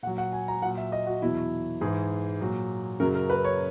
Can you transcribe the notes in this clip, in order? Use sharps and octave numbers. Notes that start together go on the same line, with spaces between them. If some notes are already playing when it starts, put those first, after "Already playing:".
A#2 F#3 F#5
F#5
G#5
A#5
A#2 F#3 F#5
E5
D#5
F#4
E2 B2 F#3 E4
G#2 E3 G#4
A#2 F#3
F#2 C#3 F#3 A#4
A#4
B4
C#5